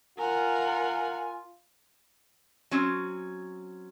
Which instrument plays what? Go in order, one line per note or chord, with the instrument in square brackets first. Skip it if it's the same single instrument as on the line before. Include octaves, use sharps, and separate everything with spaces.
[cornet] F4 [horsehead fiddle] A#4 F#5 [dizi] G#5
[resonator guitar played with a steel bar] F#3 C4 C#4